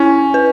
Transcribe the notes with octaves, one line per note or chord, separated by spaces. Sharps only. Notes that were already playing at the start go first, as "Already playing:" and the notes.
Already playing: C#4 E4
B4